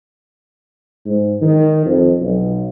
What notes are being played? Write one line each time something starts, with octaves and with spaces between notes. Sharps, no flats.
G#2
D#3
F2
B1